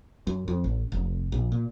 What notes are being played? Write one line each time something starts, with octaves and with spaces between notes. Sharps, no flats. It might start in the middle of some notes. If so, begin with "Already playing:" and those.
F#2
F2
A1
F1
A#1
A#2